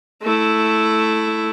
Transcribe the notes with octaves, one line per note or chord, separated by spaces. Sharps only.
A3 E4